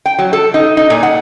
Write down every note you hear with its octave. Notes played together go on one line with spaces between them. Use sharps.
G5
F#3
A4
D#4
D#4
A#2
F#5